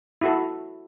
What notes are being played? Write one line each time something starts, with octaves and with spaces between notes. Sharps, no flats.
E4 F#4 A4